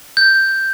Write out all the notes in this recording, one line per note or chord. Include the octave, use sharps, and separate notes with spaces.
G6